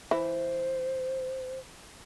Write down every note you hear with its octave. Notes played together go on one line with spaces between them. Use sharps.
E3 E4 C5